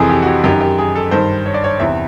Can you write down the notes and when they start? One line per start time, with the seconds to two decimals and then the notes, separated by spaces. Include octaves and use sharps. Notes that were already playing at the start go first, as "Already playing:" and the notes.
Already playing: F2 C3 E3 G#4 A4
0.09 G4
0.22 F#4
0.27 G4
0.44 F#2 D#3 G4
0.61 G4
0.78 G#4
0.95 A4
1.11 G2 D#3 C5
1.46 C#5
1.54 D5
1.64 C#5
1.80 E2 C3 E3 E5